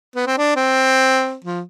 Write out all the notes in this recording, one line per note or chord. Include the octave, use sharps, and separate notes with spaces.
B3
C4
D4
C4
F3